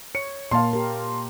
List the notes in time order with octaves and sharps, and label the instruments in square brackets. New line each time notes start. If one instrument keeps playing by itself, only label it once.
[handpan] C#5 [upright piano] C#7
[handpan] A#2 A#3 [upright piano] F5 A5 C6
[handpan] G4 A#4